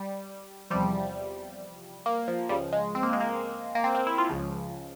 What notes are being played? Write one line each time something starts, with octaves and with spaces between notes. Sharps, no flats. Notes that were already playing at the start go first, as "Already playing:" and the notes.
Already playing: G3
E2 C3 F3 G3
A#3
F3
C#2 C#3 F3 G3
G#3
C4
A#3
G#3
A#3
A#3
C4
C4
E4
F4
C#2 C#3 F3